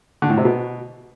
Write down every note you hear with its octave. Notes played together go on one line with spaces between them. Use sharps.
D3
A2
C3
B2